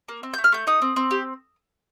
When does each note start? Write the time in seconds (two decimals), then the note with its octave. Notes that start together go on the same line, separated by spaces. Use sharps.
0.08 A#3
0.23 C4
0.34 A3 G6
0.44 F6
0.52 A3 G6
0.67 D#4 D#6
0.82 C4
0.96 C4
1.11 G4